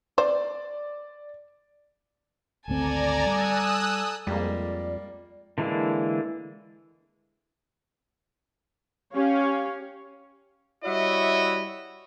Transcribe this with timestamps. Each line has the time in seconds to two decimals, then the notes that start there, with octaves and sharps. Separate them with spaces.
0.18 C5 D5
2.68 G#1 D2 C4 A4 D5 G#5 A#5
3.26 G3 D#6 E6 F#6
4.27 F2 G3 G#3 A#3 D5
5.58 D3 E3 G#3 A#3 D4
9.14 C#4 G4 C#5 F5
10.84 G3 E4 F#4 C#5 D#5 E5